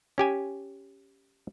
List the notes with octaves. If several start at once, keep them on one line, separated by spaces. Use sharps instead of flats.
C#4 G4 G#5